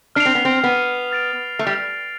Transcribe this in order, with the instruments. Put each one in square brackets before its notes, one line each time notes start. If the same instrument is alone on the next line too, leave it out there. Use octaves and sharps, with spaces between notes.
[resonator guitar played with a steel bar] D4 [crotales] F6 C7 F7
[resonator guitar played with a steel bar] C4
B3
C4
B3
[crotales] F6 A6 D7 F7
[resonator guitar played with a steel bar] A3
G3